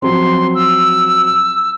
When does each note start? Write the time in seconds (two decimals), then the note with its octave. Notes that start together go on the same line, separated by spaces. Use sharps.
0.02 F3 F#3 C4 C6
0.55 E6